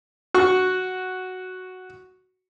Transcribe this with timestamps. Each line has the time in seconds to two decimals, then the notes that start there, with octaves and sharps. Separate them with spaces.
0.34 F#4 C#6